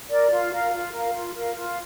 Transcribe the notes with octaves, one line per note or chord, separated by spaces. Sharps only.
A#4 D5
F4
A#4 F5
F4
A#4 F5
F4
A#4 F5
F4